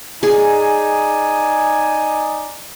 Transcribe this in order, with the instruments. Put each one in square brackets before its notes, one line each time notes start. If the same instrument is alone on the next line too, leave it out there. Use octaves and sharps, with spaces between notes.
[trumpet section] D#4 D5 G#5 [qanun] G#4